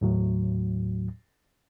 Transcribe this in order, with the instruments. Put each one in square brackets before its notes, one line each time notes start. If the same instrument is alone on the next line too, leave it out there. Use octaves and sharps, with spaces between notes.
[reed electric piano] D#2 A2 F#3